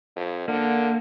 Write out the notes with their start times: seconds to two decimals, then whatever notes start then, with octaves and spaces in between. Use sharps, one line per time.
0.16 F2
0.48 D3 A#3